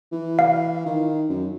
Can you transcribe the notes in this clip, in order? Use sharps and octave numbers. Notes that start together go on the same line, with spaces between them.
E3
F5
D#3
F#2